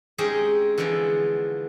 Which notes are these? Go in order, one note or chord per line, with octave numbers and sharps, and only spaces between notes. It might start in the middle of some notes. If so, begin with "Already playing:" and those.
G#3 C4 C#4 D#4 G4 G#4
D3 E3 F3 G#3 B3